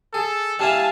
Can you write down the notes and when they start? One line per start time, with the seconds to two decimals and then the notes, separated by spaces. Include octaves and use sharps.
0.14 G#4 A4
0.59 G3 D4 E4 F5 G#5 A5